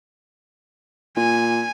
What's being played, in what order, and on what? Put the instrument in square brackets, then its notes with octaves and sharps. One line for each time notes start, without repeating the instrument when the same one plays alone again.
[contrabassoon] A#2 [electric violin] G#5